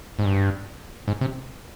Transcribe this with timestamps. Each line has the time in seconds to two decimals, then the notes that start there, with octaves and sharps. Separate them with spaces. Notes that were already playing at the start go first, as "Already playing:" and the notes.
0.19 G#2
0.25 G2
1.08 G#2
1.21 C3